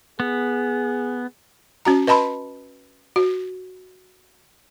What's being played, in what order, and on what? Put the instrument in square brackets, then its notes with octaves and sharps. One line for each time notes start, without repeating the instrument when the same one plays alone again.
[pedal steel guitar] B3 [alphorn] G#4
[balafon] C#4 F#4 A#5
B4 D#5 A5 B5 C6
F#4